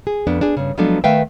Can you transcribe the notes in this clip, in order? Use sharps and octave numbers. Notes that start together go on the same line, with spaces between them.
G#4
F2 B3 D4
D4 G#4
G2 C#3
F3 F#3 G#3 B3 D4 A4
D#3 A3 B4 E5 F5 G5